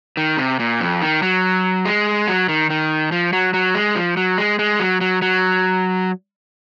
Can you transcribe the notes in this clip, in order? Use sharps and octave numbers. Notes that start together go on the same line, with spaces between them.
D#3
C3
A#2
F2
D#3
F#3
G#3
F#3
D#3
D#3
F3
F#3
F#3
G#3
F3
F#3
G#3
G#3
F#3
F#3
F#3